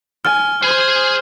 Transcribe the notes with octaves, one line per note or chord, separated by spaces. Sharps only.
G#5 F6
G#4 C5 G#5